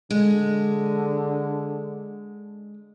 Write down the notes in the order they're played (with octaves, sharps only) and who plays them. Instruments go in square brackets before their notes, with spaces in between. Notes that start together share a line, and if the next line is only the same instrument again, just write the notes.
[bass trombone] D3 [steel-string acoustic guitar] G#3